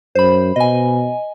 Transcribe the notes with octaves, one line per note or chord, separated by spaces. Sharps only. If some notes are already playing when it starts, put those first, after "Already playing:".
F#2 C5 B5
B2 D#5 G#5